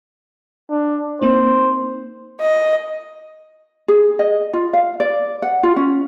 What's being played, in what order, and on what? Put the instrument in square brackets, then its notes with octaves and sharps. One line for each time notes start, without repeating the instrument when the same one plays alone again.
[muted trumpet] D4
[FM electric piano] A#3 C4 D#4 [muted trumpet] C5
[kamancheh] D#5
[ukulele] G#4
D#5
F4
F5
D5
F#5
F4
C#4